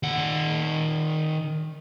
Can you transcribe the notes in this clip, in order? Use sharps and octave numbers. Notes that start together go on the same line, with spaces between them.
D#3 F#5